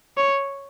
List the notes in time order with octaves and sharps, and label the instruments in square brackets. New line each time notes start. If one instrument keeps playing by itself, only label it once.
[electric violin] C#5